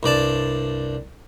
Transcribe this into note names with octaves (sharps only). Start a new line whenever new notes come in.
C2 G2 D5 A5